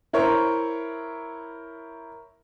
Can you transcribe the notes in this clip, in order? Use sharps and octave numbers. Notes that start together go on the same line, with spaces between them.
E4 A#4 C5 C#5